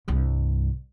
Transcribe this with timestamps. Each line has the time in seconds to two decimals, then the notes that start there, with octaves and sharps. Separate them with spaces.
0.08 C2 G2